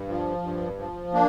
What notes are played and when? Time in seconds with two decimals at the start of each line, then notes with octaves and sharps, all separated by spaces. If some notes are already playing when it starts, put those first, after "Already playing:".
Already playing: G2
0.09 F3
0.43 G2
0.79 F3
1.13 A#3 D4